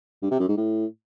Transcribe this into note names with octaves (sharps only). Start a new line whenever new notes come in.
G2
C3
F#2
G#2
A2